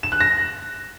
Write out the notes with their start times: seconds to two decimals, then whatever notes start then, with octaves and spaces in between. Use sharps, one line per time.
0.03 E7
0.12 F#6
0.21 A#6